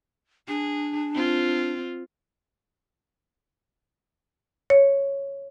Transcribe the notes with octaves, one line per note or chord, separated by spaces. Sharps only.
D4 G#4
C4 F4
C#5